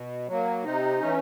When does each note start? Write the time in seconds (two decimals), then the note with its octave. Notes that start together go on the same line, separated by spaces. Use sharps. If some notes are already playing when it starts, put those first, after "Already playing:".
Already playing: B2
0.28 F#3 A#3
0.64 C3 D#4
1.00 E3 A3 C#4